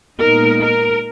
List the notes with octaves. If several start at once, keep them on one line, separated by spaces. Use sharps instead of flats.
A#2 G#3 B3 D#4 A#4
A#4